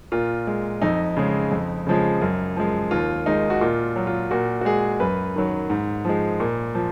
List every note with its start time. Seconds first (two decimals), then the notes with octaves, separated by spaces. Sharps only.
0.12 A#2 F4
0.47 G#3
0.82 F2 D#4
1.17 C#3 G#3
1.52 F2
1.87 C#3 F3 G#3
2.21 F#2
2.56 F3 G#3
2.91 D#2 F4
3.26 D#3 G#3 D#4
3.50 F#4
3.61 A#2 F4
3.96 F#3
4.07 F4
4.31 A#2 F#4
4.61 F#4
4.65 G#3 G#4
5.00 F#2 B4
5.36 D#3 F#3
5.70 G#2
6.05 F3 G#3
6.40 A#2
6.75 F3